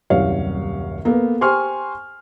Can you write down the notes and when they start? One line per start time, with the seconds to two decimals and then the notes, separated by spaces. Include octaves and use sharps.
0.10 D#1 C2 F#2 C#5 F5
1.05 A#3 B3 A4 A#4
1.41 G4 C5 G#5 C6 C#6 F6